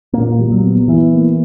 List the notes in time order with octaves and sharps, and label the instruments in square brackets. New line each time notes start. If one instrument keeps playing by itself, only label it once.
[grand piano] A#2 [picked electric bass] A#3
[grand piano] G3
[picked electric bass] F#3
[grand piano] B3
[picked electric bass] E3 [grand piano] E4
[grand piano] A#3